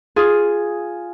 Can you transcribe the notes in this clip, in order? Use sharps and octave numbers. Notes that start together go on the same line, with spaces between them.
F4 G#4